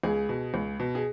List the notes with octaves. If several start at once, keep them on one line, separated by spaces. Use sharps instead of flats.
C#2 G#4
B2
C#2
B2
G#4